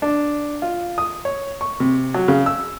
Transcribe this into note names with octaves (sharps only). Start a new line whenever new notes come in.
D4
F4
D#6
C#5
C#6
C3
F#3
C#3
E6